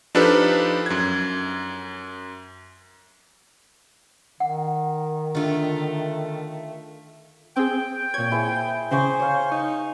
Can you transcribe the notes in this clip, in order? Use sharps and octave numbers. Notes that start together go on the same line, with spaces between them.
F3 D4 D#4 G4 A4 B4
F#2 G#6
D#3 F#5
D3 A3 F4
C4 G#4 G5
A#2 C#5 G#6
E4 G#4 C5
C#3 C5 G#5 C#6 D#6
C#5 F5
D#4 C#6